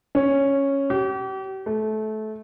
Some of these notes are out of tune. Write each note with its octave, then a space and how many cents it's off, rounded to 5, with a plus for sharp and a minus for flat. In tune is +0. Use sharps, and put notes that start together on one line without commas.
C#4 -5
G4 -40
A3 -25